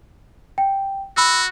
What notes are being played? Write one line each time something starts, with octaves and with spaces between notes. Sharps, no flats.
G5
F#4 B5 E6